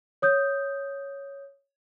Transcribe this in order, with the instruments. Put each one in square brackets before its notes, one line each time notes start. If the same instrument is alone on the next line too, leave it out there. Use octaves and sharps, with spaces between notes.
[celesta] C#5 D#6 G6